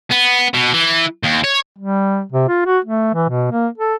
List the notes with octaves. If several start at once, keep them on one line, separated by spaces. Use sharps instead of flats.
B3
B2
E3
D#2
C#5
G3
C3
F4
F#4
A3
E3
B2
A#3
A4